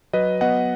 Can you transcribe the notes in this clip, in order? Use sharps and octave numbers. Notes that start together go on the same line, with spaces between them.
F#3 B4 D#5
B3 D#5 F#5